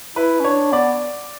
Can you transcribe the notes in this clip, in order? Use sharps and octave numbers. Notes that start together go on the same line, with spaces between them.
E4 B4
C#4
D4 C#5
B3 D5